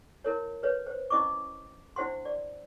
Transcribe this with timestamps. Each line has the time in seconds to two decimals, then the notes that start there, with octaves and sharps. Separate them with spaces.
0.24 E4 A#4 C#5
0.63 B4 C#5
0.87 C5
1.10 C#4 E4 D#5 C#6 D6
1.96 D4 E4 C5 F#5 C6
2.25 D5